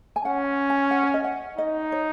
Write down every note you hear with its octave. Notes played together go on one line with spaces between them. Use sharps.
G#5
C#4 F#5
G#5
F#5
C#5
D#5
F#5
D#4 D#5
C#5